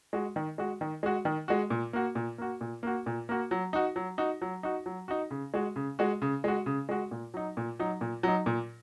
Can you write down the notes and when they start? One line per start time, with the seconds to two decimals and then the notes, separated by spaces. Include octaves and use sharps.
0.13 G#3 F#4
0.36 D#3
0.58 G#3 F#4
0.81 D#3
1.03 G#3 F#4
1.25 D#3
1.48 G#3 F#4
1.70 A#2
1.93 A#3 F#4
2.15 A#2
2.38 A#3 F#4
2.61 A#2
2.83 A#3 F#4
3.06 A#2
3.29 A#3 F#4
3.51 F#3
3.73 D#4 F#4
3.96 F#3
4.18 D#4 F#4
4.42 F#3
4.63 D#4 F#4
4.86 F#3
5.08 D#4 F#4
5.31 C#3
5.54 G#3 F#4
5.76 C#3
5.99 G#3 F#4
6.22 C#3
6.44 G#3 F#4
6.66 C#3
6.89 G#3 F#4
7.11 A#2
7.34 F#3 D#4
7.57 A#2
7.80 F#3 D#4
8.01 A#2
8.23 F#3 D#4
8.46 A#2